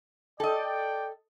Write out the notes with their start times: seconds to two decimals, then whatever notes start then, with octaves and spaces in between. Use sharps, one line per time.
0.40 A4 D5 D#5 G5